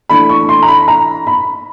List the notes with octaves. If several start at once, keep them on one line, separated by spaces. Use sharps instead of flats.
E3 A3 D4 B5
C#6
C6
A#5
B5
A#5
B5